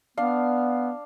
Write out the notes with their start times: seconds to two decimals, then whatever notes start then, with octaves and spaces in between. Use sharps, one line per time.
0.17 B3 D4 F5